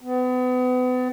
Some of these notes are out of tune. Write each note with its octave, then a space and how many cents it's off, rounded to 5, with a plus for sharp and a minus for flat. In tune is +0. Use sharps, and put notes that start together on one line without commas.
B3 +35